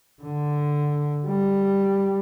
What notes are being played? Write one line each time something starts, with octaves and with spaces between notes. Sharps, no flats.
D3
G3